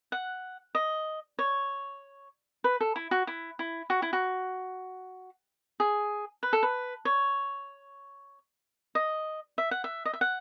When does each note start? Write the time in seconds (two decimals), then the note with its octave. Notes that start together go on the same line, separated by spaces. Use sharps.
0.12 F#5
0.75 D#5
1.39 C#5
2.64 B4
2.81 A4
2.96 E4
3.11 F#4
3.27 E4
3.59 E4
3.90 F#4
4.02 E4
4.13 F#4
5.80 G#4
6.43 B4
6.53 A4
6.63 B4
7.05 C#5
8.95 D#5
9.58 E5
9.71 F#5
9.84 E5
10.05 D#5
10.13 E5
10.21 F#5